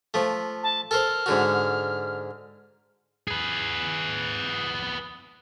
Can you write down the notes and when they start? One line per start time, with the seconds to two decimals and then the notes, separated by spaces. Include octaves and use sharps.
0.14 F3 A3
0.63 A5
0.91 A4 A#4 C5 F6
1.26 G#2 D3 F#4
3.28 G#4 B4